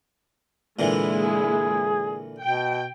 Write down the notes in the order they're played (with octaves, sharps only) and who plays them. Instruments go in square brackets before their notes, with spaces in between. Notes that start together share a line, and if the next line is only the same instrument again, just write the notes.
[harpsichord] A#2 D3 E3 [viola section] G#3 A#3 E4
[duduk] G#4
[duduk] B2 [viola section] G5